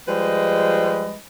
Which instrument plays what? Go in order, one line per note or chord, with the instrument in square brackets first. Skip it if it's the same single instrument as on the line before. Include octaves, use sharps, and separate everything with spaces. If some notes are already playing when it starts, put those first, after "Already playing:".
[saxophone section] F3 G3 G#3 B4 D#5